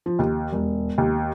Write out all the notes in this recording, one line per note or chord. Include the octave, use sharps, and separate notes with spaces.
F3
D#2
E1
D#2